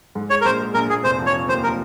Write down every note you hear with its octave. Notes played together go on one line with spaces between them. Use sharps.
G#2
G#3 C#5
A#4
A#1 C5
G#3
A#1 A#4
A#1 G#4
F1 C5
F3
C#5
F3
D#2 C5
F3 A#4